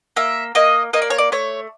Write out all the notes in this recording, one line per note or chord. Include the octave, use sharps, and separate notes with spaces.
A#3 E5
A#3 D#5
A#3 D#5
D5
C#5
D5
A3 C#5